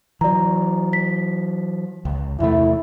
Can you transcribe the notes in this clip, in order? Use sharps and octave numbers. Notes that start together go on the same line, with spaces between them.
E3 F#3 D5 A#5
B6
C#2
E2 C3 A3 E4